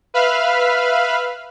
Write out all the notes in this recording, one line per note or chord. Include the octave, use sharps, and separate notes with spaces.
B4 E5 F5 B5 F6